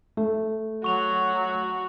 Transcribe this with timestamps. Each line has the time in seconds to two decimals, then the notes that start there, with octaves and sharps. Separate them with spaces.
0.17 A3
0.84 F#3 F#4 C#6 F7